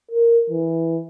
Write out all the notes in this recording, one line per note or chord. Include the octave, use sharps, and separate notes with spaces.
A#4
E3